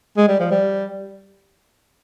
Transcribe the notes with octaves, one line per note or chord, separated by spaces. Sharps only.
G#3
G3
F3
G3